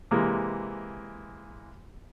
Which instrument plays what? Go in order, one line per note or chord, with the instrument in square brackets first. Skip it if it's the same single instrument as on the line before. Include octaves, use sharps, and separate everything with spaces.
[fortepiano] C3 E3 G#3 A#3